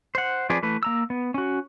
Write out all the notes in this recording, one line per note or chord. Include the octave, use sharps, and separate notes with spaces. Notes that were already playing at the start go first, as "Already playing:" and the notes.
C5 F#5
F3 C4 G#4 B4 D5
E3 A3 B4
A#3 A#5 E6
B3
C#4 F#4